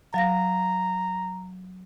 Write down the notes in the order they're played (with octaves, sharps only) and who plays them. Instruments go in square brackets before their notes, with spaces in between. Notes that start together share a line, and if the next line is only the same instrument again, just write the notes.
[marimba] F#3 F5 A#6 [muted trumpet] A#5